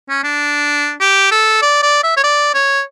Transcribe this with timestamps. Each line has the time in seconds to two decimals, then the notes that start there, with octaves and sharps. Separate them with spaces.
0.09 C#4
0.24 D4
1.01 G4
1.31 A4
1.62 D5
1.83 D5
2.04 E5
2.17 C#5
2.24 D5
2.54 C#5